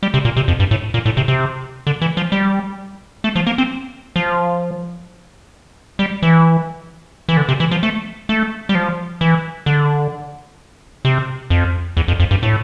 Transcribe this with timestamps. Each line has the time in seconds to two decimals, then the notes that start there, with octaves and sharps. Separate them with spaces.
0.03 G3
0.14 C3
0.25 A#2
0.37 C3
0.48 F2
0.60 G2
0.71 A2
0.94 A#2
1.06 A2
1.17 C3
1.28 C3
1.87 D3
2.02 E3
2.17 F3
2.32 G3
3.24 A3
3.36 F3
3.47 A#3
3.58 C4
4.16 F3
5.99 G3
6.22 E3
7.29 E3
7.37 D3
7.49 C3
7.60 E3
7.71 F3
7.83 A3
8.29 A3
8.69 G3
8.75 F3
9.21 E3
9.66 D3
11.05 C3
11.50 F2
11.97 E2
12.08 F2
12.20 F2
12.31 G2
12.43 A2